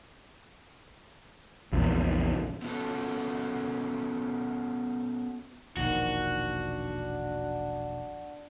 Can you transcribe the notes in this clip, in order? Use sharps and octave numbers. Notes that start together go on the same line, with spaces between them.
A#1 E2
B3 C#4 D4 F4 F#4 A4
E1 A#1 D#3 D4 F#4